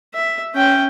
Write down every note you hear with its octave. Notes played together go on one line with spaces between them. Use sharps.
E5
C#4 G5